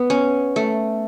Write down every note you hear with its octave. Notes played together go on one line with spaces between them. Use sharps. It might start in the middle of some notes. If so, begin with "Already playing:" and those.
Already playing: B3
C#4
A3